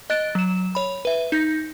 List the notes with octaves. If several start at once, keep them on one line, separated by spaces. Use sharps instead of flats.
D#5 F#6 A6 D7
F#3 E7
C#5 B5
B4 E5
D#4 G6 A#6